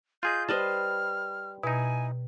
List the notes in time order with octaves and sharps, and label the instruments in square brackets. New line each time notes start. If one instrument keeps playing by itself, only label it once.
[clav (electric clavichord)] F4 G#4 D#5 [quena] G6
[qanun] G3 B4 C5 [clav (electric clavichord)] D#5 A5 [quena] F6
[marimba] B2 [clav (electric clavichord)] D#4 E4 [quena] G#5